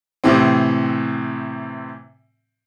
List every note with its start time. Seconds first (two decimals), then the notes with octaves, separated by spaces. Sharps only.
0.24 A2 C3 E3 C4